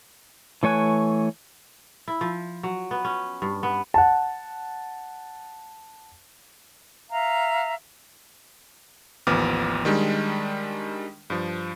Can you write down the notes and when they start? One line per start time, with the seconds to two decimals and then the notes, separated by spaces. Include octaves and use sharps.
0.63 E3 A3 C#5 G#5 F#6
2.08 E4
2.21 F3
2.63 F#3
2.91 B3
3.05 C#4
3.42 G2
3.63 B3
3.94 F#5 A5
7.10 E5 F5 A#5
9.27 A1 D#2 F3 B3 D6 F6
9.85 D#3 G3 G#3 D4
11.30 G2 F3